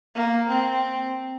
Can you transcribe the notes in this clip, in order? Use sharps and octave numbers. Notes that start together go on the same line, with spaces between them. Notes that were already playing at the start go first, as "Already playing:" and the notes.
A#3
C4